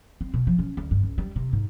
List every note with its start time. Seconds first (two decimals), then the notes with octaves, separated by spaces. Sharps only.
0.21 C4
0.34 B2
0.47 F3
0.59 C#4
0.77 D2
0.91 G2
1.03 C#2
1.18 G3
1.36 C3
1.53 G#2